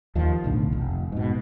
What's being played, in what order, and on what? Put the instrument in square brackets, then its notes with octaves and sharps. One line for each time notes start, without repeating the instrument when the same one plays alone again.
[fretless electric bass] D#2 D#3 F3
B1 A2 D3 D4
F1
G#2 B2